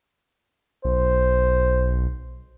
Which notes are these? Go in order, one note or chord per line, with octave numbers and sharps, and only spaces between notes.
B1 C5